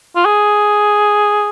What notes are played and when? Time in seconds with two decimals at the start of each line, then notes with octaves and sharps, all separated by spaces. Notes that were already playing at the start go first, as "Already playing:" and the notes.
0.16 F4
0.25 G#4